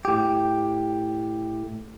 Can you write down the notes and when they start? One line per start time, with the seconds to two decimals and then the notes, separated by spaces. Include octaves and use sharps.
0.05 A2 G4